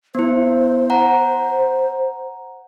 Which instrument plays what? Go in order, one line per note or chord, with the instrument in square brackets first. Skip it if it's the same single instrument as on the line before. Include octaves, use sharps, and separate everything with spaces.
[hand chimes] B3 E4 [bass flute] C5
[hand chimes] F#5 A#5